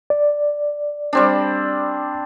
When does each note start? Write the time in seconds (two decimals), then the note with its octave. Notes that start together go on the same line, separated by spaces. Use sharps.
0.10 D5
1.13 G3 C4 D4